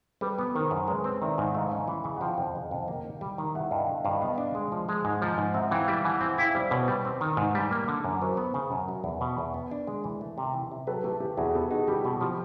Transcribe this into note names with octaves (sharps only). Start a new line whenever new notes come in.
G3 A4 B4
B3
D#3 A#4 C5
F#2
G#3 B4 C#5
C4
D#3 D5 E5
G#2
A3 D#5 F5
C#4
E3
C#3
F#5
F3 F5 G5
F2
C#3
F2
A#3
D#3
G3
D#3
G3 E5 F#5
G2 D#5 F5
D3
G2 D#5 F5
B3 D#5 F5
D4
G#3
F3
G#3
G#2
F3
G#2
C4 E5 F#5
E3 F5 G5
G3
E3 F#5 G#5
C4 F#5 G#5
E4 F5 G5
G3 C5 D5
B2 B4 C#5
G3
C4
D#3
G#2
G3
A#3
D3
F#2
F#3 A#4 C5
B3
C#3
F#2
F#3
E2
B2
E2
B3
D4
G#3
E3
A3
C3
E3
C3
F#3 A4 B4
A3 G4 A4
C#3 G4
E2 F#4 G#4
B3 G4 A4
D#4 F#4 G#4
G3 G4
B2 G4
F3 G4